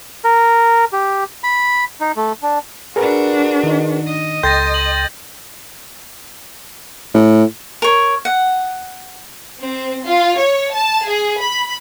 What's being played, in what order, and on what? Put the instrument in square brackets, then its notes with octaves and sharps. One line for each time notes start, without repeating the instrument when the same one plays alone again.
[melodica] A#4
G4
B5
D#4
A3
D4
[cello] D4 F#4 [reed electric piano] G#4 A#4 B4
[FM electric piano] D#3 D#4
[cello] D#5
[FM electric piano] C#2 A4 G5 [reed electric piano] C6 [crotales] G6 A6 A#6
[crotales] F#7
[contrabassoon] A2
[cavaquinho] A#4 C#5
F#5
[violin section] C4
F4
C#5
A5
G#4
B5